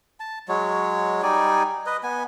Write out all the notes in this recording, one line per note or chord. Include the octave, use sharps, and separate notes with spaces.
A5
F#3 G#3 C#5
G3 D#4 D5 G#5
B4 D#5
B3 G#5